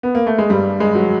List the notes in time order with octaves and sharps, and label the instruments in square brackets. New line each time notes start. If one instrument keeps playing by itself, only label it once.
[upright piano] B3
A#3
A3
G#3
G2 G3
G#3
F#3